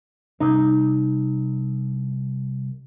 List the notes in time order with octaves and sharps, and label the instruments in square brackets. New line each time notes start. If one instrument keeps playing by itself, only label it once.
[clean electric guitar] C2 [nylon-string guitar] D#4